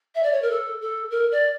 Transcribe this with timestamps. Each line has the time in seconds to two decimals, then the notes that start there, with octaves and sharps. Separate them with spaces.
0.15 E5
0.23 D5
0.32 C#5
0.42 A#4
0.51 A4
0.81 A4
1.11 A#4
1.31 D5